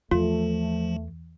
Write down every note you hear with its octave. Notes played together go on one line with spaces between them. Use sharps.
E2 F3 A3 F4